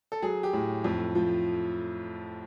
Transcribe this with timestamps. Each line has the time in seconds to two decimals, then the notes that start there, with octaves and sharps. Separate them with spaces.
0.12 A4
0.22 F#3 G#4
0.43 G4
0.53 A2
0.84 F2
1.15 F3